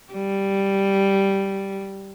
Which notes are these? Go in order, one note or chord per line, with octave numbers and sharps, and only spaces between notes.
G3